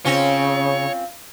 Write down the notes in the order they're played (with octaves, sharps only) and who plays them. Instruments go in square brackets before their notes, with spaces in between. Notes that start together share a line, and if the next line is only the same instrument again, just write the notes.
[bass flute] C#3 [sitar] C4 C#4 F4 [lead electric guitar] C#5